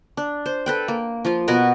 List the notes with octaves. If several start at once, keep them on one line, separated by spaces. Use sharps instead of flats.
D4
C5
A4 B4 G5
A#3
F3 F4
B2 F#4 A#4 B4